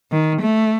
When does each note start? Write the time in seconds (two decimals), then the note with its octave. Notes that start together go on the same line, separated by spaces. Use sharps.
0.12 D#3
0.41 A3